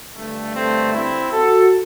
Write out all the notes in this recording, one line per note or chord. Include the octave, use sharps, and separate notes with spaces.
G2 D3 G3 A3
A3 C4
C4 E4
F#4 A4